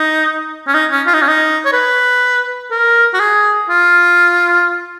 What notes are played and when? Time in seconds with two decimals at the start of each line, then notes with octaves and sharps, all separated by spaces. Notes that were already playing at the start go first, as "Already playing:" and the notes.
Already playing: D#4
0.67 C#4
0.74 D#4
0.90 C#4
1.07 F4
1.14 D#4
1.22 C#4
1.28 D#4
1.65 C#5
1.73 B4
2.71 A#4
3.14 F#4
3.20 G#4
3.70 F4